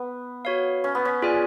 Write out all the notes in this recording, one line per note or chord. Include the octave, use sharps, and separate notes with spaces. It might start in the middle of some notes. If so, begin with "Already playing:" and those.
Already playing: B3
F#4 C#5 F5
C#4
B3
C#4
F4 G#4 D5 G#5